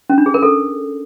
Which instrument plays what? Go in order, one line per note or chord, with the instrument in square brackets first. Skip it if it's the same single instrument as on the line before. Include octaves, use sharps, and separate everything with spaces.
[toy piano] C#4
D4
G#4
A#4
A4